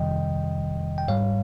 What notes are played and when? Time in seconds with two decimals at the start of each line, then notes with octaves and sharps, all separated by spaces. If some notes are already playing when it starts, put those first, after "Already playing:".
Already playing: F2 C3 D#3 G3 D#5 G5
0.98 G5
1.08 G#2 G3 C#5 F5